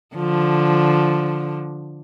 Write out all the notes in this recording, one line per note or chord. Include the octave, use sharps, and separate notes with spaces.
D3 F3